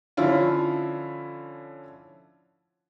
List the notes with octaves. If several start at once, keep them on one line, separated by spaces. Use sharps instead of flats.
D3 F3 C#4 E4 F4